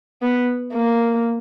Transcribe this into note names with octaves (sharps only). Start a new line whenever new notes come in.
B3
A#3